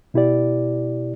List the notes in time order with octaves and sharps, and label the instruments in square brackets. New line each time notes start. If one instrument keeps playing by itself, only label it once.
[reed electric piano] B2 E4 G4 D5